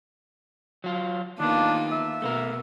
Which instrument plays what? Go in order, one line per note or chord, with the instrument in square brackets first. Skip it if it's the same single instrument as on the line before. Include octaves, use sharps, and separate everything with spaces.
[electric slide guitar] F#3 F4
[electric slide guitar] D#3 B3 [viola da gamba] A#3 D#4 F4 [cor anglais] D4
[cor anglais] E5
[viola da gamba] B2 [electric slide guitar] A3 B3 A#4